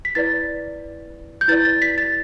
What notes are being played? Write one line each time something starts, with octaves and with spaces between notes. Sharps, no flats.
B6
E4 B4 D5 A6
G6
E4 B4 D5 A6
A6
B6
A6